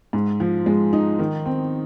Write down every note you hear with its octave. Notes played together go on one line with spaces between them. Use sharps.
G#2
F3
G#3
D#4
D#3
C4